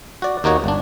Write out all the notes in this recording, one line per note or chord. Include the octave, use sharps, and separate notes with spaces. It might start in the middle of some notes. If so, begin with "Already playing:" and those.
F#4 D5
D#2 A#3 D#4 F#4 C#5
G1 D4